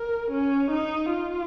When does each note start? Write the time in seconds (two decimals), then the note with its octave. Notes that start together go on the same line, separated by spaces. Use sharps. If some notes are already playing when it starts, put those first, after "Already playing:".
Already playing: A#4
0.31 C#4
0.71 D#4
1.11 F4